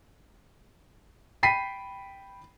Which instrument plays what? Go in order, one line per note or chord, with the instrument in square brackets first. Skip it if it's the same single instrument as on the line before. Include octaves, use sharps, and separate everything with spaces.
[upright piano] G5 B5 B6 C7 D#7